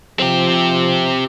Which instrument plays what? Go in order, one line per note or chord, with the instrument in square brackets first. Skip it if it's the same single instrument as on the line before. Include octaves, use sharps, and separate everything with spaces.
[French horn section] F3 [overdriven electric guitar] C4 G4